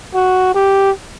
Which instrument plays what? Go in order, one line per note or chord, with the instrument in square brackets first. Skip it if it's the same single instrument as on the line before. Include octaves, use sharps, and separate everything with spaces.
[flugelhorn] F#4
G4